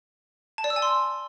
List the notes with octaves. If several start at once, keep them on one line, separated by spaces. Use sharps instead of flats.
A5
D5
E6
G#5
C6